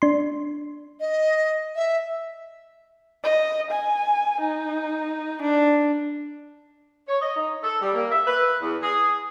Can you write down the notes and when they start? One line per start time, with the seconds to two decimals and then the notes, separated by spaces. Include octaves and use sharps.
0.02 D4 C6
1.00 D#5
1.75 E5
3.24 D#5
3.71 G#5
4.41 D#4
5.43 D4
7.08 C#5
7.21 D#5
7.36 D#4
7.63 A4
7.81 G3
7.94 A#3
8.11 E5
8.27 B4
8.62 E2
8.82 G#4